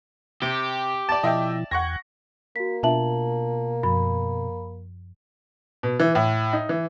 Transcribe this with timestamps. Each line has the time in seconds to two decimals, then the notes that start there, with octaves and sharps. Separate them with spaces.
0.42 C3 G4
1.09 D5 A5
1.23 B2 F3 E4 D#5 E5 G5
1.71 E2 F#5 G5 C#6 G#6 A#6
2.56 A#3 F#4 B6
2.83 B2 D4 F4 E5 A5 F#7
3.83 F#2 F3 B5
5.83 B2
6.00 E3
6.15 A2
6.53 D#4
6.69 E3